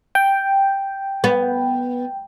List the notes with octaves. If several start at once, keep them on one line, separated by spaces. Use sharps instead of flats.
G5
B3